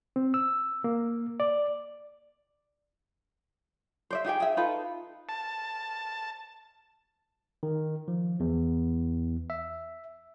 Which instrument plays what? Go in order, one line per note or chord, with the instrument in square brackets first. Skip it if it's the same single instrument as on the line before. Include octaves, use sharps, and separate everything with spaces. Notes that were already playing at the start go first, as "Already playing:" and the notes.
[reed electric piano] C4
E6
A#3
D5
[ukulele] C5 D5 E5
D#4 G4 G#4 G5
G#4 E5
D#4 F4 A4 B4
[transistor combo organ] A5
[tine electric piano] D#3
F3
E2
E5